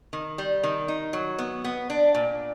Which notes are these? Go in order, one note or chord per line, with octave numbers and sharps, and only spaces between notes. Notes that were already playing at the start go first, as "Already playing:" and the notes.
D#3
G3
D#3
D#4
F#3
B3
B3
D4
A#2